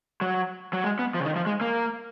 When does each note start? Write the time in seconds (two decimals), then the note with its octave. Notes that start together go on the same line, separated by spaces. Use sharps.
0.21 F#3
0.73 F#3
0.84 G#3
0.99 B3
1.14 F3
1.20 C#3
1.25 D#3
1.36 F3
1.46 G#3
1.61 A#3